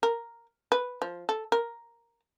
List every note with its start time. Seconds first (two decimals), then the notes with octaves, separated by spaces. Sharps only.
0.03 A#4
0.72 B4
1.02 F3
1.29 A4
1.52 A#4